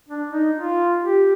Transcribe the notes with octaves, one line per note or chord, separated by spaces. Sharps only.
D4
D#4
F4
G4